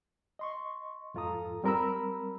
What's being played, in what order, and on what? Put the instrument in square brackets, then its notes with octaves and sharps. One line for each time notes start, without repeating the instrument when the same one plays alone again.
[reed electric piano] D#5 C6 C#6
F2 G#2 F4 A4 A#5 D#6
G3 C4 A#4 A#5 B5 E6